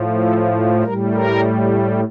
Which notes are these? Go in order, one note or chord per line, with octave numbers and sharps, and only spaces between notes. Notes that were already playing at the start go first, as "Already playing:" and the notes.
Already playing: A2 F3
A4
A2 G3 A#4
A#4